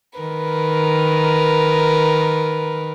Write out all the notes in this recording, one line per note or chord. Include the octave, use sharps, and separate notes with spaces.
D#3 A#4 B4